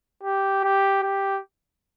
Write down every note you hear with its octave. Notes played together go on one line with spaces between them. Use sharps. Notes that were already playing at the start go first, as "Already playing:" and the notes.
G4
G4
G4